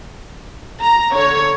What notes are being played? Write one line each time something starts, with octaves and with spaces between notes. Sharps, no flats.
A#5
D3 C#5